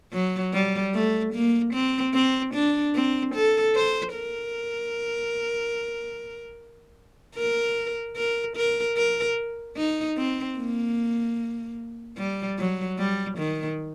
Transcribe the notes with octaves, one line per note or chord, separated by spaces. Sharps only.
F#3
G3
A3
A#3
C4
C4
D4
C4
A4
C5
A#4
A#4
A#4
A#4
A#4
D#4
C4
A#3
G3
F#3
G3
D#3